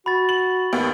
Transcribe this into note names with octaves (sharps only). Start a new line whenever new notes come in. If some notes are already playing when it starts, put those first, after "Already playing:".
F#4 B5 A6
F#7
D#2 B3